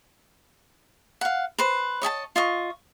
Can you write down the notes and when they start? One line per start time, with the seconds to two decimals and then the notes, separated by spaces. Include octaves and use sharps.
1.21 F5 F#5
1.58 B4 C5
2.02 C#5 D#5 G#5 A5
2.36 F4 D#5 C#6